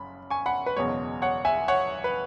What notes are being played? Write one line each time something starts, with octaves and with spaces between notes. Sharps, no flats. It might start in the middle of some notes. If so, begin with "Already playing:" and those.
Already playing: F#1 F#2 B5
G#5 C#6
F#5 B5
B4
F#1 E2 B2 G#3 C#5
C#5 F#5
E5 G#5
C#5 F#5
B4